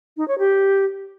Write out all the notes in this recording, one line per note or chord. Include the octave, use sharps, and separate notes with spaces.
D#4
C#5
G4